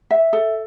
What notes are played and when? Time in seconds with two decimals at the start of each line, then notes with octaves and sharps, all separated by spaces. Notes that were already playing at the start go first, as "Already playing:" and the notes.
0.11 E5
0.33 A4